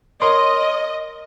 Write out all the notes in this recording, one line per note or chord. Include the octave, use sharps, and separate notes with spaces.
A#4 C#5 D#5 C6